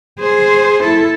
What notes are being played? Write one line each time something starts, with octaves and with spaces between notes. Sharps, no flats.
G#4 C5
E4 A4